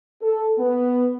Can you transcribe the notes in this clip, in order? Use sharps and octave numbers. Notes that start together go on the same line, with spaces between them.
A4
B3